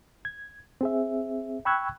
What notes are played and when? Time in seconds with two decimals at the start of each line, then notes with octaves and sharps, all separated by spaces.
0.25 G#6
0.81 C4 G#4 E5
1.65 G5 B5 C#6 E6 F#6 G#6